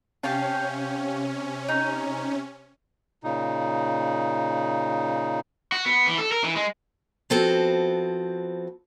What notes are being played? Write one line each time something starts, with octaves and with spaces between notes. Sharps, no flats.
C3 C#4 G4 F5 A5
D#4
A#2 C#3 D#4
F#4
B3
E3
A4
A#4
E3
G#3
F3 B3 C4 F#4 A4